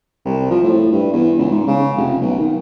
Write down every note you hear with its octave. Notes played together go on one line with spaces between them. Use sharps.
C2
F3
A2
G2
E2
C#2
G#2
C#3
F1
B1
D#3